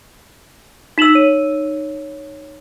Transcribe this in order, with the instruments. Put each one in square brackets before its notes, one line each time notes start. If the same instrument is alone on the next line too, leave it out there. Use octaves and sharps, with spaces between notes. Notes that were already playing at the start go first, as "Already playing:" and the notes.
[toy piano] D#4 E6 [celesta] B6 E7 F#7
[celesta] C#5 D#7